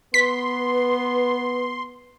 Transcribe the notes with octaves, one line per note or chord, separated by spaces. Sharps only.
B3 B4 C6 B6